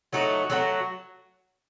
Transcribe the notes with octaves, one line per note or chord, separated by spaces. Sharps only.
F#3 A3 D#4 F#4
F#3 A3 D#4 F#4